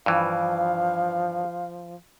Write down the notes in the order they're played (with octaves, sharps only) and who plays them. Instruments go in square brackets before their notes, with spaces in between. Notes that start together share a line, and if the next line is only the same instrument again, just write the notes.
[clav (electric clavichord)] G2 E3 [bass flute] F3 [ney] F5